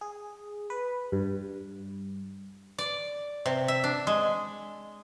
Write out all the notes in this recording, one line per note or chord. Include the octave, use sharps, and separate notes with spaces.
G#4
B4
G2
D5
C3
E5
D4
G#3